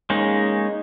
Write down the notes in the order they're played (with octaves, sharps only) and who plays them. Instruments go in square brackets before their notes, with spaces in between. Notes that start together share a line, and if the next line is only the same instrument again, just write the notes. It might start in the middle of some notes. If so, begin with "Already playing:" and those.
[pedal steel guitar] G#3 A#3 C#4 D#4